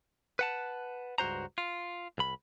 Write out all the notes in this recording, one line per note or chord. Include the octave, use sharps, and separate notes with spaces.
B4 F#5 A5
C#2 G2 F#4 C5 A#5
F4
C2 B5